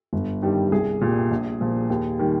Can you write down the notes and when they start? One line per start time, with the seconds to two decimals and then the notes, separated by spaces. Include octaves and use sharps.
0.13 G1
0.42 G2 D#3 G3
0.72 C2 G#4
1.01 A#2 G3
1.31 A#1
1.61 A#2 F3
1.90 D#2
2.19 D#3 G3